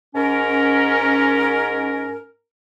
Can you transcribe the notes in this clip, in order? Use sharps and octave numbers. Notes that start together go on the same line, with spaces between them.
G#2 C#4 A#4